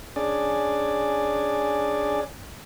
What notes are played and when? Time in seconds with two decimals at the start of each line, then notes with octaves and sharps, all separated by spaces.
0.16 C#4 D4 G#4 D5